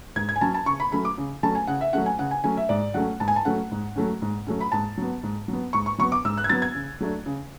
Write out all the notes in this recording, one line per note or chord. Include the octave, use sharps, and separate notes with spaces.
G#2 G#6
G#6
G#5
F#3 C#4 A5
A5
C#3 C#6
B5
F#3 A3 C#4 B5
D6
C#3
F#3 A3 C#4 A5
G#5
C#3 F#5
E5
F#3 A3 C#4 F#5
G#5
C#3 F#5
G#5
F#3 A3 C#4 G#5
E5
G#2 D5
F#3 A3 C#4 F#5
G#2 A5
G#5
A5
F#3 A3 C#4 F#5
G#2
F#3 A3 C#4
G#2
F#3 A3 C#4
B5
G#2 A5
F#3 B3
G#2
F#3 B3
G#2 C#6
C#6
F#3 B3 C#6
D6
G#2 E6
F#6
G#6
F#3 B3 A6
G#6
C#3
F#3 A3 D4
C#3